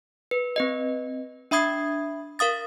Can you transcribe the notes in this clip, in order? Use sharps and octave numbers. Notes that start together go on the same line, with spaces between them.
B4
C4 B4 D#5
D4 E5 B5 D#6 G#6 C7
A#4 F5 D#6 A6